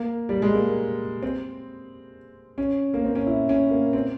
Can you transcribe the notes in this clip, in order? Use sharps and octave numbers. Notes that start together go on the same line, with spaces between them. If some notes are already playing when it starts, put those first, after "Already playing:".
Already playing: A#3
G3
G#3
A#3
C4
C#4
A#3
C4
C#4
E4
C#4
A#3
C4